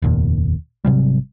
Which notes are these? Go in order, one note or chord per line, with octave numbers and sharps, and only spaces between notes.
F1 D#2 A#2
G#1 C3 F#3 G3